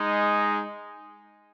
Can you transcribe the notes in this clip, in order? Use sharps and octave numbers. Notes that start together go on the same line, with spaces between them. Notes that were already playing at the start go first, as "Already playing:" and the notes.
Already playing: G#3 D#4 G#4